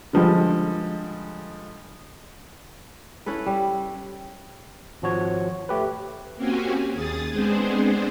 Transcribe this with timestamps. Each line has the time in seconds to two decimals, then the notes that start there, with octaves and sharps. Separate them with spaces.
0.13 D3 F3 G3 G#3
3.26 C#4 E4 A4 B4
3.46 G3
5.02 G#1 F3 F#4 C#5
5.69 A3 G4 B4
6.36 A#3 C4 C#4 F#4 G4 G#5
6.93 D#2 G#4 D#6 A6
7.31 G#3 B3 C4 D4 G#4 C5